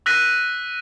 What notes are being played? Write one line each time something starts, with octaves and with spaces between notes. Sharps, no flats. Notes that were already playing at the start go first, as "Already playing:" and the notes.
E6 F#6 A#6 B6 D#7